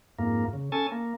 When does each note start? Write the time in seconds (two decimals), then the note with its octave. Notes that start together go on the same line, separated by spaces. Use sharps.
0.19 F2 G#2 A#3
0.53 C#3
0.72 C#4 A4 G#5 A5
0.92 A#3